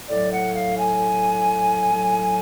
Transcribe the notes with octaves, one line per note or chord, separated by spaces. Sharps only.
A2 F#3 D5
F#5
F5
G#5
A2 F#3